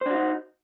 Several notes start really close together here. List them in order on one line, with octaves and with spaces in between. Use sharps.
C5 D4 F#4 D#4